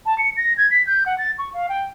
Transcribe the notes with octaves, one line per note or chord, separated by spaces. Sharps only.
A5
C#7
A#6
G#6
B6
G6
F#5
A6
C#6
F5
G5